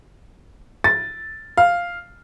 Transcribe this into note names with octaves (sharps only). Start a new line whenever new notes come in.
A6
F5